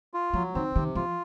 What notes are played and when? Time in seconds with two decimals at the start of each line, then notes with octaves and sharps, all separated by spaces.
0.14 F4
0.34 F3 F#3
0.55 D#3 C4
0.75 C3 D#3
0.95 F3 F4